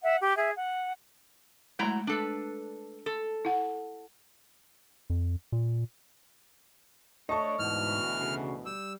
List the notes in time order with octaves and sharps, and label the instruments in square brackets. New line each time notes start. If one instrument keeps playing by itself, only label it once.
[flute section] E5 F#5
G4
G#4 E5
F#5
[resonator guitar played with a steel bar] F#3 E4 A#5 [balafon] G#3 A3
[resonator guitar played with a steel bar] D4 A4 B4
A4
[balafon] E4 F#5
[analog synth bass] F2
A#2
[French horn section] A3 D4 [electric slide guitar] C#5 [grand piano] D#5 A5 C#6
[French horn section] D2 B2 E3 [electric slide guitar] G#2 [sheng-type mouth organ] F6
[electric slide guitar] C#3
[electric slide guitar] G3 [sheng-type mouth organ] E6